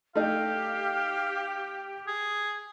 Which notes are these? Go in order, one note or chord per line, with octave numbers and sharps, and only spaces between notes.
A3 D#4 G4 F5
G#4